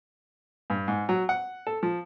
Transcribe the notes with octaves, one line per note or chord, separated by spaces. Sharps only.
G2
G#2
F#3
F#5
A4
F3